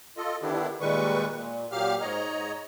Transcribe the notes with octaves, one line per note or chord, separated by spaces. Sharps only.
F4 A4 D#5
D3 D#3 B3 D4 E4 G4
A#2 D#3 G3 G#3 B4 C#6
A#2
A#2 F#3 G4 F5 F6
G#2 C#5 D#5 A#5